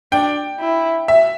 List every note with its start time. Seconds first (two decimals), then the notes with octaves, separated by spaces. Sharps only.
0.12 D4 G5
0.60 E4
1.08 E5